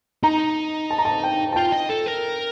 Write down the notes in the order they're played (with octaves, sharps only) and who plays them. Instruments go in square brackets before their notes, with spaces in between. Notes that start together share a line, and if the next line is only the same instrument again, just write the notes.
[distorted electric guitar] D#4 [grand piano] A#5
[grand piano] A5
A#5
A5
G5
A5
[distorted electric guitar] F4 [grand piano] G5
[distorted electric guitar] D#5
A4
A#4